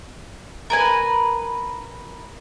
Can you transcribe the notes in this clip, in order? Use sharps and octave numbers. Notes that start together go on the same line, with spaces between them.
A#4 B4 G#5